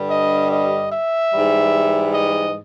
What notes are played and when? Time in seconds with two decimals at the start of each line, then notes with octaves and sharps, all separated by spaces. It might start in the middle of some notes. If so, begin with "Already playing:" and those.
Already playing: G2 D3 G3
0.10 D#5
0.51 D#5
0.91 E5
1.32 G#2 E3 G3
2.13 D#5